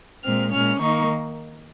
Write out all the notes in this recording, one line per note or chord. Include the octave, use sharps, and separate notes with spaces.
A#2 G#3 C4 F6
A#2 G#3 C#4 F6
D#3 A#3 D#4 C#6